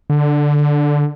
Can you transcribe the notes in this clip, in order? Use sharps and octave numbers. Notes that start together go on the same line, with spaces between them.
D3